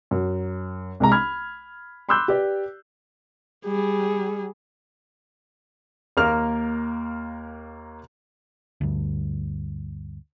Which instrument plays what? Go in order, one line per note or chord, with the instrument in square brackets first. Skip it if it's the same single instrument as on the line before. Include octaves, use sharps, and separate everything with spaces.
[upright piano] F#2
C2 G#3 A#5
B5 F6 G#6
B5 C6 D6 E6 F#6 G6
G4 B4 D5
[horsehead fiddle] G3 G#4
[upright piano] D#2 A#3 A#4 F6
[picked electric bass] D2 G2